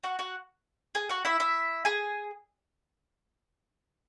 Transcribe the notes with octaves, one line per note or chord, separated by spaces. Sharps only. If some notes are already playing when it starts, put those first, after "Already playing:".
F#4 F#5
F#4 F#5
G#4 G#5
F#4 F#5
E4 E5
E4 E5
G#4 G#5